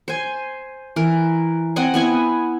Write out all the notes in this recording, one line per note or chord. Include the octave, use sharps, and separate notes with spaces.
C5 G#5
E3 A#4
C4 D#5 F#5 G#5
B3 E4 G#5